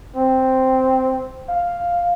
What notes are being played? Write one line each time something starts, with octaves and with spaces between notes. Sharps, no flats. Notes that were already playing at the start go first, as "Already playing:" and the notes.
C4
F5